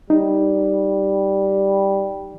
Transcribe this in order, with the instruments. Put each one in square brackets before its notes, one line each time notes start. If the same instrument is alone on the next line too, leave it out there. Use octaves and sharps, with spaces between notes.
[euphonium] G3 [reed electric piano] D#4